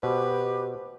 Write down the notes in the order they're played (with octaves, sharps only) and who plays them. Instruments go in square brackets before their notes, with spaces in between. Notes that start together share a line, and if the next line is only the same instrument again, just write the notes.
[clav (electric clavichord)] B2 [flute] G4 [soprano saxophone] B4 [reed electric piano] C5